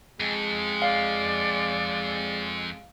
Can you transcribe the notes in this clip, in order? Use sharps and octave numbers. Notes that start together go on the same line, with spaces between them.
F2 G#3
D5 F5